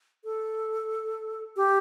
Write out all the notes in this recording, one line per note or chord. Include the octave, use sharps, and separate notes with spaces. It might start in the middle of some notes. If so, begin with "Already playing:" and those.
A4
G4